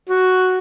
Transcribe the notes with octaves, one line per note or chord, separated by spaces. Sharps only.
F#4